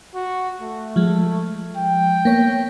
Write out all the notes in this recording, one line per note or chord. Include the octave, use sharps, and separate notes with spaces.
F#4
A3
F3 G#3
G5
A#3 B3 C#5